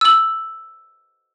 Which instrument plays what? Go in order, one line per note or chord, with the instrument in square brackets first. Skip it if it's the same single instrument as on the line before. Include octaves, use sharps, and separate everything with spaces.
[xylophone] E6 F#7